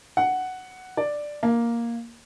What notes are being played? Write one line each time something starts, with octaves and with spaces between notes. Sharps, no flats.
F#5
D5
A#3